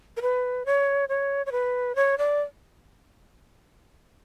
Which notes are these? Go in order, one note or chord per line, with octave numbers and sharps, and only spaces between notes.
A#4
B4
C#5
C#5
C#5
B4
C#5
D5